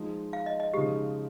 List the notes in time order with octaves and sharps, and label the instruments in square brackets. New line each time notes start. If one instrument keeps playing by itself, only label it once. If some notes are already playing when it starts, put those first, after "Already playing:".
Already playing: [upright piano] F3 G#3 D#4
[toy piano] F5
D#5
D#5
[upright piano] C#3 F3 G#3 D#4 [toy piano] G4